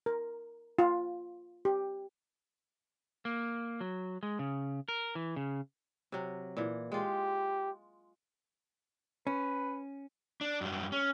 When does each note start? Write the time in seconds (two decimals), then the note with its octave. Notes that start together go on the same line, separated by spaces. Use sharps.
0.06 A#4
0.79 F4
1.65 G4
3.25 A#3
3.81 F#3
4.23 G#3
4.39 C#3
4.88 A#4
5.15 E3
5.36 C#3
6.12 C3 F#3
6.57 A#2 E3
6.92 G#3 F4 G4
9.27 C#4 B4
10.41 D4
10.61 F#2 G3
10.92 C#4